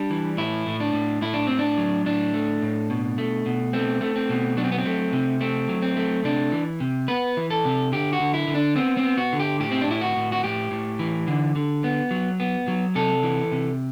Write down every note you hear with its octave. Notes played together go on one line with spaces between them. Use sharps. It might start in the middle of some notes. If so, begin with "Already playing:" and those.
Already playing: G3 D4
E3
A2 E4
A2
D4
A2
A2 E4
D4
A2 C4
D4
F#3
A2 D4
A3
A2
B2
A3
B2
A3 C4
A3
C4
B2
F#3 D4
C4
B3
C4
A3
C3
A3 C4
F#3
C4
A3
C3 D4
E3
C3
B3 B4
E3
A4
C3
D3 G4
F#4
D3
E4
D3
D4
B3 C4
C4
B3
F#4
D3
G4
A2 G4
C4
D4
A2 E4
F#4
A2
F#4
A2 G4
A2
E3
D3
D3
B3
F#3
B3
F#3
C3 A4
E3
C3